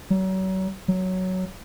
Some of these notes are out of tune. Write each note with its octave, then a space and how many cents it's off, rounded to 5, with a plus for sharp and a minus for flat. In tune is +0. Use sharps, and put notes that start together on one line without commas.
F#3 +35
F#3 +5